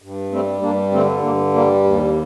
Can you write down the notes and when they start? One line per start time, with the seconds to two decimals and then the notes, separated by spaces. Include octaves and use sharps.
0.02 G2
0.32 G3 A3 C4
0.62 G2 A#3 D4
0.92 D3 A3 C4
1.22 G2 A#3
1.54 G3 A#3
1.83 D#2